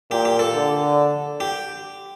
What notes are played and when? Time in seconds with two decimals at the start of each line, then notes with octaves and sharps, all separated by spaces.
0.10 A#2 G4
0.25 G4
0.39 A4
0.54 D3
1.40 G4